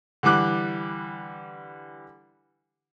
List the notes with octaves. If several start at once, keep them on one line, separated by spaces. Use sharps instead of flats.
D3 E3 G3 D6 F#6